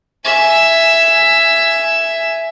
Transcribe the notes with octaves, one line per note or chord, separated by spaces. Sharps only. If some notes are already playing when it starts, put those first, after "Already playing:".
E5 G#5